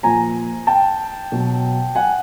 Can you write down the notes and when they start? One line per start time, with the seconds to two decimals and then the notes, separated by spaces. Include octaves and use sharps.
0.03 A#2 F3 G#5 A#5
0.67 G5 A5
1.32 B2 F#3
1.95 F#5 G#5